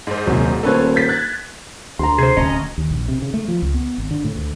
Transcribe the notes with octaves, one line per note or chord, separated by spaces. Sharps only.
G#2 C5
D#1 C2 F#3
D#1 A3 C#4 A4 B4 C5
G6 A6 B6
F#6 G#6 A6
D2 A#5 C6
C3 G#4 C5
D1 C#4 D#5
D#2
A#1
C3
C#3
A3
F3
C#2
B3
G#1
D3
A2
D2